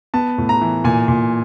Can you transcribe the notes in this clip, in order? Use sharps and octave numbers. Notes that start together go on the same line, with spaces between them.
B3 A5
A2
A#5
E3
A#2 G#5
A#2